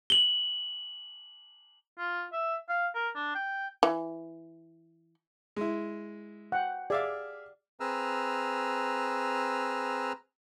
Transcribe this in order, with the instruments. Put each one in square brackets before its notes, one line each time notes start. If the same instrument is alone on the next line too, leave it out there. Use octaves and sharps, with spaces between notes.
[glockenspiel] F#7 G7
[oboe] F4
E5
F5
A#4
D4
G5
[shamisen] E3
[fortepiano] G#3 E4
[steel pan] F#5 G5
[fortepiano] G#4 E5 F5 [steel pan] D5
[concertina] C4 G#4 B4 A#5 E6 F6